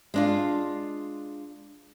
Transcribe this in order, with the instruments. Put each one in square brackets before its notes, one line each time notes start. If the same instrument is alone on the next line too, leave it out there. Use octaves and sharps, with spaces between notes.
[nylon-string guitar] G#3 D4 F4